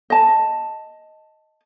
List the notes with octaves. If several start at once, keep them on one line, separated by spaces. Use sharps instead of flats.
D#5 A5